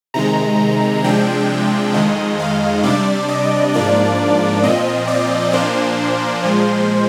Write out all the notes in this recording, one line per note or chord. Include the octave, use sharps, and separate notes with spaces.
C3 D#3 G#3 A#5
C3 F3 G#3 D4 G5
F2 D#3 G#3 D#5
F5
C3 G3 D4 D5
D#5
G#2 F3 A#3 D4 D5
A#2 F3 C4 D#5
D5
A#2 F3 A#3 D4 C5
A#2 F3 G#3